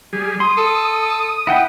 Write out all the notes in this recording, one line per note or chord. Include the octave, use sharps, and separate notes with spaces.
G3 G#4
C6 D#6
A4
E4 F#5 G5